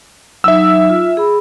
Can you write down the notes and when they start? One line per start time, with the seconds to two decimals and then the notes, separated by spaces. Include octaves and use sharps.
0.44 F#3 D#4 E5 E6
0.90 F4
1.17 G#4 B5